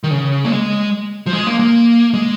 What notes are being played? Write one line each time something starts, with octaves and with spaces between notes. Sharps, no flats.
D#3
C#3
A#3
G#3
F3
G#3
A#3
A#3
G#3